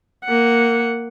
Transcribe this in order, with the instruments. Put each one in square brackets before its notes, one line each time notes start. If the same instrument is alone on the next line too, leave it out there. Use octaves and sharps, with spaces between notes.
[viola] A#3 F#5